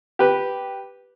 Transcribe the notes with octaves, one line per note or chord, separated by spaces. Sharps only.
G4 B4